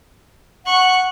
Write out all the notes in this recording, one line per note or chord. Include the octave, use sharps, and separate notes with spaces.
F#5 C#6 F#6